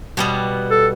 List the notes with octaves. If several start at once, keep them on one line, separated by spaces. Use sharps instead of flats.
B2 G3 B3
A4